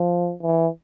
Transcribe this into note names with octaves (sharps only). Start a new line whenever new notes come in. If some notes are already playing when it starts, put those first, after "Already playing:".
Already playing: F3
E3